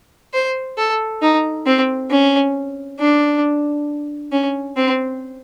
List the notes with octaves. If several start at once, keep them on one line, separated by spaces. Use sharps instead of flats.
C5
A4
D#4
C4
C#4
D4
C#4
C4